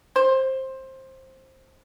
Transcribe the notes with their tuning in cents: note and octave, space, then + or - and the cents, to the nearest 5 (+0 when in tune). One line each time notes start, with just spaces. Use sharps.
C5 +15